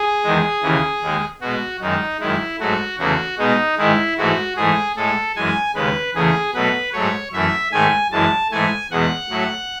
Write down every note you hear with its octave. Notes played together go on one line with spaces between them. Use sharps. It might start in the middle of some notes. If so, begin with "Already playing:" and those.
Already playing: G#4
E2 D#3 G#3
D#2 C#3 E3
D#2 D#3 G#3
B2 G#3 F#4
F#2 D#3 G#3 D#4
F#2 D#3 G#3 E4
G#2 F#3 A3 F#4
E2 C#3 E3 A3 F#4
B2 G#3 D#4
G#2 D#3 G#3 E4
G#2 E3 A3 F#4
G#2 E3 A3 G#4
A2 G#3 A4
F#2 E3 G#3 G#5
D#2 C#3 G#3 B4
E2 C#3 E3 A3 G#4
B2 F#3 A3 B4
G#2 F#3 A3 C#5
F#2 E3 A3 E5
G#2 D#3 A3 G#5
F#2 E3 G#3 A5
G#2 E3 A3 G#5
E2 B2 G#3 F#5
A2 F#3 A3